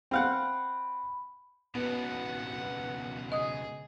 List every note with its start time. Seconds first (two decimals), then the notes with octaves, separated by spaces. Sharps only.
0.11 C4 F5 F#5 B5
1.75 C#2 B2 B3 F#5
3.32 G#4 D#5 D#6